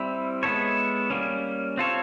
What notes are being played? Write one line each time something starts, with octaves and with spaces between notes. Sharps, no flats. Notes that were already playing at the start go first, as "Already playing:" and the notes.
Already playing: G3 C4 E4
G#3 B3 E4 A4 C#5
G3 A#3 C#4
C4 F4 A4 C#5